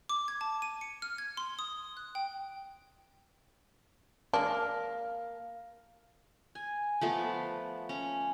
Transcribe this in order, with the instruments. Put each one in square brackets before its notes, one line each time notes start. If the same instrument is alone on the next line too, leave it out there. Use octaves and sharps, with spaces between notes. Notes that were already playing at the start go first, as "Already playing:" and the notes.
[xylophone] D6
G#6
A5
D#7
C#7
F6
G#6
C6
D#6
F#6
G5
[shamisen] G#3 D4 [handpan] A#4 [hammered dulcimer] F5
[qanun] G#5
F3 A3 B3
C#4